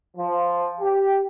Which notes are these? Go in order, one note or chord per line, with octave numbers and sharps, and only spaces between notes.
F3
G4